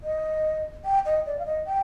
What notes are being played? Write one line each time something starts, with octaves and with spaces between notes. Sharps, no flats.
D#5
G5
D#5
D5
F5
D#5
G5